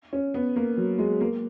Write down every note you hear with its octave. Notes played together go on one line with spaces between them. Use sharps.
C#4
B3
A#3
F#3
G#3
A#3